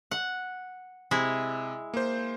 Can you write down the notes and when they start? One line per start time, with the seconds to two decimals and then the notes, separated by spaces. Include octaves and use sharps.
0.11 F#5
1.11 C3 G#3 E4
1.94 A#3 C5